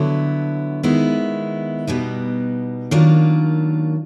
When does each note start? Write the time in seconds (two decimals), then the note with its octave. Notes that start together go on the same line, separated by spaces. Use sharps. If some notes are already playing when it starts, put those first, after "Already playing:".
Already playing: D3 F#3 B3 E4
0.83 D#3 G#3 B3 E4
1.87 B2 G3 B3 D#4
2.91 D#3 F#3 A#3 D4 F4